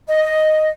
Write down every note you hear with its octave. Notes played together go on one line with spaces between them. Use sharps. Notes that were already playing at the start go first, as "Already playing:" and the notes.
D#5